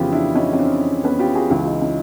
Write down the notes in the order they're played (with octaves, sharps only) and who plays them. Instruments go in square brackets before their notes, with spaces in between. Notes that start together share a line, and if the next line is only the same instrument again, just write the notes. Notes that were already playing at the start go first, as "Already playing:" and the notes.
Already playing: [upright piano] F2 C#3 E3 B3 C#4 F4 G4
D4 E4
C#4 D#4
C#4
C4 D4
B3 C#4
F4 G4
F#4 G#4
C#2 C#3 E3
D#4 F4
C#4 D#4